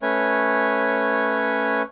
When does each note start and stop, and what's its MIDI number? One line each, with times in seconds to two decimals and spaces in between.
0.02 1.82 57
0.02 1.82 61
0.02 1.82 71
0.02 1.82 73
0.02 1.82 80